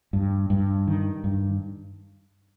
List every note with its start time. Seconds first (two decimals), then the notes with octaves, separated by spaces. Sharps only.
0.13 G2
0.50 G2
0.87 D#3
1.24 G2